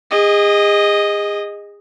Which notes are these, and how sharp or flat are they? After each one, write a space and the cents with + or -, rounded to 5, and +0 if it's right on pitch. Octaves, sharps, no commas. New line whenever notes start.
G#4 -30 D#5 +0